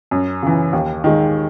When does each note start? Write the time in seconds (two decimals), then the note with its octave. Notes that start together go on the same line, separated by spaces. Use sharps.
0.11 F#2
0.43 C#3 E3
0.73 D#2
1.04 D#3 G#3